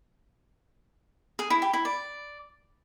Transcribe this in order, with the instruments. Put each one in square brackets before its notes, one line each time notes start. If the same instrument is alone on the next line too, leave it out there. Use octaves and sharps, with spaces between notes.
[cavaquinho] G#4
E4
G4
E4
D5